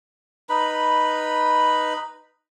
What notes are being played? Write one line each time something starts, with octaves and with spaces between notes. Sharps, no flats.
D#4 B4 B5